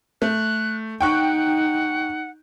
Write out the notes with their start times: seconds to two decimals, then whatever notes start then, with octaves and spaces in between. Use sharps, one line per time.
0.22 A3 F#6
1.01 D#4 F#5 G5 C#6 F#6